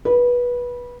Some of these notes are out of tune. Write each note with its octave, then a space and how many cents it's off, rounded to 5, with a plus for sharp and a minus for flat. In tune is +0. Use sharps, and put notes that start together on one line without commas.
B4 -20